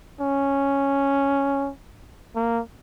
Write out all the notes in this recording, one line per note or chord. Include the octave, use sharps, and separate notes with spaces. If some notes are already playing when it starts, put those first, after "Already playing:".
C#4
A#3